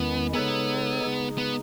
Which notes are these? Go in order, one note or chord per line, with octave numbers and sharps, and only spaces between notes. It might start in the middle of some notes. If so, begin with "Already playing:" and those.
Already playing: E2 D#3 G#3 B3 C#4 E4
C#3 G#3 B3 D#4 A4 C#5
C#3 G#3 D#4 G#4
B3